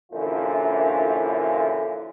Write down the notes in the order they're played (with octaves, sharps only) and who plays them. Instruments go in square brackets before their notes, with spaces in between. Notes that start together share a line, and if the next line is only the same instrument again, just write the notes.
[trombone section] A#1 F#2 D3 E3 E4 F4